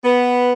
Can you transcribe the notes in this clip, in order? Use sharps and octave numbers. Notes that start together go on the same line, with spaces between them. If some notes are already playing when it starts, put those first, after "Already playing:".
B3